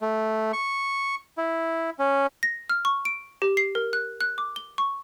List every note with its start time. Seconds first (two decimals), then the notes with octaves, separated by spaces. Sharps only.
0.01 A3
0.53 C#6
1.38 E4
1.99 C#4
2.43 A#6
2.69 F6
2.85 C#6
3.05 D7
3.42 G4
3.57 C7
3.75 A#4
3.93 F#6
4.21 F#6
4.38 D6
4.56 G7
4.78 C#6